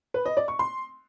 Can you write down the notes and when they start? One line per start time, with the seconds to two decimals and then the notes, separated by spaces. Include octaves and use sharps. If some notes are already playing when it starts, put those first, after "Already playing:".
0.14 B4
0.26 D#5
0.37 D5
0.48 C#6
0.59 C6